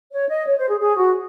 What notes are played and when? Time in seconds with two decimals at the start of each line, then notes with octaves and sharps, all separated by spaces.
0.12 C#5
0.29 D#5
0.46 C#5
0.58 C5
0.69 G#4
0.80 G#4
0.97 F#4